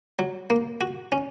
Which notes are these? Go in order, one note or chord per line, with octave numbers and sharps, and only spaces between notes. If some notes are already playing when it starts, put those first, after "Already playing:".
F#3
A#3
F#4
C#4